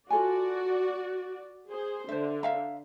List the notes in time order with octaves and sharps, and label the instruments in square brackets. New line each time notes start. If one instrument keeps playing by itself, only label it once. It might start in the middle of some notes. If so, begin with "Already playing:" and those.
[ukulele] F4 A4 G#5 [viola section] F#4 D5
[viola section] G#4 C5
[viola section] D3 [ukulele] C5 E5
[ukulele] E5 F5 A#5